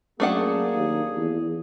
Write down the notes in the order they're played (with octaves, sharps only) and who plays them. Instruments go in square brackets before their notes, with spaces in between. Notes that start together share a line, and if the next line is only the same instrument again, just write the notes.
[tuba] F#2 [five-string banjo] A3 D4 F#5 [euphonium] A#3 [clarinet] G#4
[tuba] D#2
E2